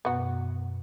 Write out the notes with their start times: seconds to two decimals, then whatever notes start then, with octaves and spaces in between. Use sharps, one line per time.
0.05 F#2 B2 B3 F#4